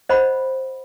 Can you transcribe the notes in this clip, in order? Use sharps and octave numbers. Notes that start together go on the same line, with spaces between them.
C5 D#5 F#5 B5